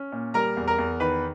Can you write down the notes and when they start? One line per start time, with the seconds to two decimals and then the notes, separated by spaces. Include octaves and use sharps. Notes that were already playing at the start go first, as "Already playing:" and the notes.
Already playing: C#4
0.12 A#2
0.34 G3 A#4 A#5
0.57 E2
0.68 A#4 A#5
0.78 E2
1.00 D#3 B4 B5